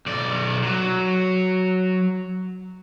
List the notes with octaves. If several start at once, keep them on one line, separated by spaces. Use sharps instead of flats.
B1 D5
F#3